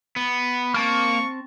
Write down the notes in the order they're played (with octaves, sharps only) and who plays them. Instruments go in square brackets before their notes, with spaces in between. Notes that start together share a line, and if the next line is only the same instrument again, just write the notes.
[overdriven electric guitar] B3
[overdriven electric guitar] A#3 [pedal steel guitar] C4 A5 F6 [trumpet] C#6